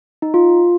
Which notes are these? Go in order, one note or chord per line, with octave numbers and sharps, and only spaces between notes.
D#4
F4